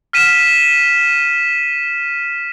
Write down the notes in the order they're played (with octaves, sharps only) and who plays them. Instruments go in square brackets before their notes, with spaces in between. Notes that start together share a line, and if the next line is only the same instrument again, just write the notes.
[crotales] F6 B6 D#7 E7